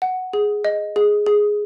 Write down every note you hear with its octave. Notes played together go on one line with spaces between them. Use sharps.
F#5
G#4
D#5
G#4
G#4